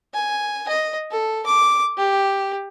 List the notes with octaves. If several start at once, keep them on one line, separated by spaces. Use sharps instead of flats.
G#5
D#5
A4
D6
G4